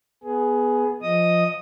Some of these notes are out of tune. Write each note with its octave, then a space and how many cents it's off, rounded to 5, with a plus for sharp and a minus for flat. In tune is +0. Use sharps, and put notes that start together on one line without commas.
B3 +0 G#4 +10
F3 +0 D#5 +0 D#6 +0